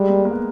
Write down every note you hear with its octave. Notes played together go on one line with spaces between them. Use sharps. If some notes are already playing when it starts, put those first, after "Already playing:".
Already playing: G3 G#3
A#3
A#3
B3